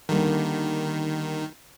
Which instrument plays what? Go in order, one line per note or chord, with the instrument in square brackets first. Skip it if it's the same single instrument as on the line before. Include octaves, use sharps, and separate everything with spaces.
[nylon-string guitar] D3 G3 A#3 [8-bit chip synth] D#3